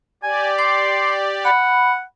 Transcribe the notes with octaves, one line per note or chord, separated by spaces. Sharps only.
G4 D5 G#5
C6 D6
F#5 B5